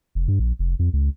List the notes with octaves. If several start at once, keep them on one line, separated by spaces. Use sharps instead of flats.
F1
G2
A#1
F1
F2
C#2